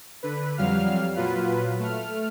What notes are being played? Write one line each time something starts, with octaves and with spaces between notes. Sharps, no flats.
D3 B4
F2 F#3 G3 F5 F6
A#2 F#3 F4 B4
A3 F6